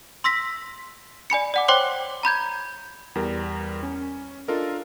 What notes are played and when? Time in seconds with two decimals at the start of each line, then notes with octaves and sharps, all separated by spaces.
0.24 C6 E6 A#6 B6
1.30 D5 G#5 B5 C#7
1.54 D5 F#5 D6
1.68 C5 C#5 G5 C6 D6 F#6
2.23 A#5 B5 G6 G#6
3.15 E2 G3 A#4
3.83 C#4
4.48 D4 F4 A4 A#4 D#5